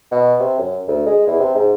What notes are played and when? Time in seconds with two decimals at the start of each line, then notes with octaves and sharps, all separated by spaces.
0.11 B2
0.40 C3
0.58 F#2
0.88 D2
1.06 G#3
1.27 E2
1.39 C3
1.54 G#2